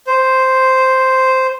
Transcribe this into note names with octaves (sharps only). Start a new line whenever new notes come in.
C5